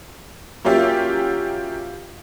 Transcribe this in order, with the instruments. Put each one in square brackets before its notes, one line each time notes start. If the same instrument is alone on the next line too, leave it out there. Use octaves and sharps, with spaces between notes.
[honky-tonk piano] F#3 A#3 C#4 F4 G4 E5